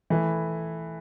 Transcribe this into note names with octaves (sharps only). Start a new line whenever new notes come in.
E3 A3 E4